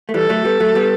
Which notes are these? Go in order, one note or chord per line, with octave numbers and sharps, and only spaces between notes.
A3
E3 G3 A4
F#3 A3
G3 B3
F#3 A3
G3 B3